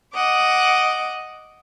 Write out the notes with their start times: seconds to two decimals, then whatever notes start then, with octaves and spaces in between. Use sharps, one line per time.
0.14 D#5 F#5 D6